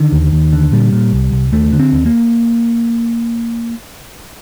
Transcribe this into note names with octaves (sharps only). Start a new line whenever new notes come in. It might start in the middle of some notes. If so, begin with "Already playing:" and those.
Already playing: D3 D#3
D#2
D#2
D3
A#2 G3
A#2
C2
C2
D#2 A3
D3
C4
D#2
A#3